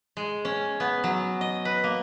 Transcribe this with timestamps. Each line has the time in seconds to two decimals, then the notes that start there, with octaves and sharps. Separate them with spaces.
0.17 G#3
0.45 C#4
0.80 B3
1.04 F#3
1.41 D#5
1.65 B4
1.84 A#3